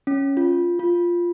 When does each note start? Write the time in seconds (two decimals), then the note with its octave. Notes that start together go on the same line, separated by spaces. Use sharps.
0.07 C#4
0.37 F4
0.79 F4